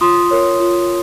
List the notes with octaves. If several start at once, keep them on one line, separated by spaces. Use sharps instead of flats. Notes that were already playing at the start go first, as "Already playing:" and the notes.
F4 C6 D#6
A#4 C#5
F4